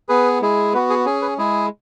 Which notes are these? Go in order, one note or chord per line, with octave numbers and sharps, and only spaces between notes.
B3 G#4 B4
G#3 E4 G#4
B3 F#4 B4
G#4
C#4 G#4
B4
G#3 E4 G#4